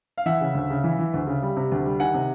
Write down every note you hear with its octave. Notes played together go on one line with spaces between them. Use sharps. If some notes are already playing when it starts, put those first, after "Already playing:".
F5
E3 E5 F#5
C#3
D2
C#3
E3
E3
D2
C#3
G3
C3
D2
G3
D#3 F#5 G#5
C3